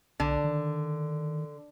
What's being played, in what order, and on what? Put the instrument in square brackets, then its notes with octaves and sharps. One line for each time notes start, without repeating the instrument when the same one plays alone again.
[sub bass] B1 [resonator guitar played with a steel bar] D3
[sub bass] D#3